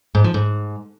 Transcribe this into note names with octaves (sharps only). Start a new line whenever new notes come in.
G#2
F3
G#2